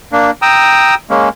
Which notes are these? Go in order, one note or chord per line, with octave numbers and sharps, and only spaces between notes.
A#3 D4
G5 A#5 D#6 E6
G#3 A#3 C#4